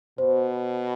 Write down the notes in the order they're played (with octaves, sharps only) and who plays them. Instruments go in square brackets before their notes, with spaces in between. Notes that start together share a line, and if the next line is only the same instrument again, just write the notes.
[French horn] B2 [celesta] C5